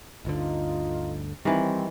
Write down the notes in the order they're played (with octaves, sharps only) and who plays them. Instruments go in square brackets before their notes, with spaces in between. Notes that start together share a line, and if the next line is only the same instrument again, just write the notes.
[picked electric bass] G1 D2 D3 [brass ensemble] D#4 F4
[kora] D#3 E3 [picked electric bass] G3 [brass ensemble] C4